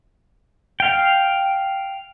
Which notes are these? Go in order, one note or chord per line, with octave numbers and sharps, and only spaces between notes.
F5 G5